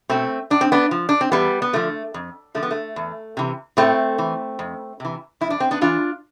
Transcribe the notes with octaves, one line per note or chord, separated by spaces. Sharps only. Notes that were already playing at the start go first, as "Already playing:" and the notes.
B2 A3 C4
A2 D4
C4
B3 D4
F3
D4
C4
E2 G3 B3
B3
D3 F3 A3
F2
D3 F3 A3
B3
A3
E2
C3 E3
A2 A3 C4
E3
F2
C3 E3
F2 E4
D4
C4
B3 D4
E3 D4 F4